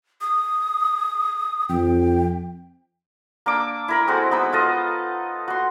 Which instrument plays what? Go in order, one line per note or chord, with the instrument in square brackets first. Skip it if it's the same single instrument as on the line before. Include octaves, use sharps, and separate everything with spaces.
[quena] D#6
[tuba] F2 [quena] G5
[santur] A#3 D4 D6 E6
E4 A#4 B5
G#3 C4 F#4 A4
B3 D#4 B4 E6
F4 A4 D#5
F#4 C6